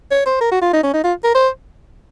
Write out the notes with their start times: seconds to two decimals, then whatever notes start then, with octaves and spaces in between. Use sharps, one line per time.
0.11 C#5
0.26 C5
0.41 A#4
0.52 F#4
0.62 F4
0.73 D#4
0.83 C#4
0.94 D#4
1.04 F4
1.24 A#4
1.35 C5